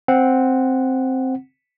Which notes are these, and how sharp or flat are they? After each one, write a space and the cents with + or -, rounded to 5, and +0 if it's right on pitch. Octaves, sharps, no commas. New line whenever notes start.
C4 +0 F#5 +0